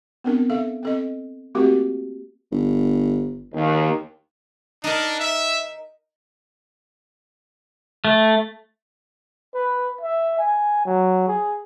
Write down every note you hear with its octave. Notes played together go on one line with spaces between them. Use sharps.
B3 C4 D4 A#4
A4 E5 F5
C4 A4 D#5
A3 A#3 C4 F#4 G4 A#4
G1
D#2
D4 D#4 A#4
E5
A3
B4
E5
G#5
F#3
G#4